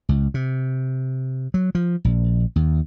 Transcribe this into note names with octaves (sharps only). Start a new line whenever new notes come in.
C#2
C3
F#3
F3
A#1
D#2